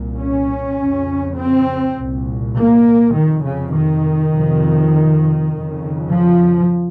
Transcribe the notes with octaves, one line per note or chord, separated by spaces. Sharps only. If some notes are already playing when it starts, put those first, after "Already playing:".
Already playing: C2 A#2
C#4
F2 C#3
C4
C2 A#2
A#3
F2 C3 D#3
C#3
D#3
F2 C3
F2 C#3
F3